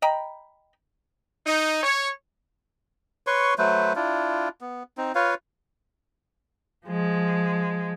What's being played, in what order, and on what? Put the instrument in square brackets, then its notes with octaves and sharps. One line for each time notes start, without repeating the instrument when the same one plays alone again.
[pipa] D#5 G5 A#5 B5
[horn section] D#4
C#5
[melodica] B4 C#5 C6 C#6
F#3 A3 B4 C5
D4 E4 F4
B3
C4 D#4
F4 B4 C#5 F5
[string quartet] F3 G#3